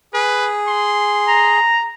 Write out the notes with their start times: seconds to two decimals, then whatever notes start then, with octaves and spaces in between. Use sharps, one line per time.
0.14 G#4 B4
0.68 C6
1.28 A#5